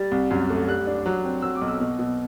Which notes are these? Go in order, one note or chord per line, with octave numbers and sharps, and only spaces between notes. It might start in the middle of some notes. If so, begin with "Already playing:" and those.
Already playing: G3 A6
C2
F#2
A3
G3 F#6
D4
F#3
C4
F#3 E6
D6
B1
E6
B2
B2